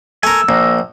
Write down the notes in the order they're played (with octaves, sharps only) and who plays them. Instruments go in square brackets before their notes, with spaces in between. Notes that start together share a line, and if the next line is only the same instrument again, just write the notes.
[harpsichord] A3 A#4 [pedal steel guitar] G#5 [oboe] E6
[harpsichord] A#1 [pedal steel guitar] A#3 A#4